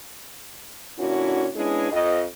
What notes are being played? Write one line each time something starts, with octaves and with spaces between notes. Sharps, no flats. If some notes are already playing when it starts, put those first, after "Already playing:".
A#2 D3 C#4 D4 E4 F#4
G#3 B3 C#4 D4 E4 G#4
F2 D#5